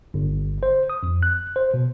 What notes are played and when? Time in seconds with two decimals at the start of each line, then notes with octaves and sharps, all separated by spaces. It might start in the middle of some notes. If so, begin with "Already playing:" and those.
0.14 G1
0.63 C5
0.90 D#6
1.03 F2
1.23 F#6
1.56 C5
1.74 B2